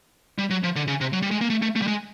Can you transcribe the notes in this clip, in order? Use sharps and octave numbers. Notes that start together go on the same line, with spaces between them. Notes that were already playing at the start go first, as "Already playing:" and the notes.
G3
F#3
F3
D3
C#3
C3
F#3
G3
G#3
A#3
A3
A3
A3
G3
G#3